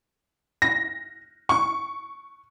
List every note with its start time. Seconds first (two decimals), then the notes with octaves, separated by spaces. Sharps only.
0.62 A#6
1.49 C#6